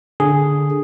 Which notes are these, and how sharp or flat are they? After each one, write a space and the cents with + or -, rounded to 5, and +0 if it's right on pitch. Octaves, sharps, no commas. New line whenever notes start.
D3 +0 G#4 +0